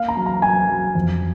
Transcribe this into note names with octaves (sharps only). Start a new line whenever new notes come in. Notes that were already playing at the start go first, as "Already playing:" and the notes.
Already playing: A#3 F5
A#5
F#3
A#5
F#3 G#5
F#3
F2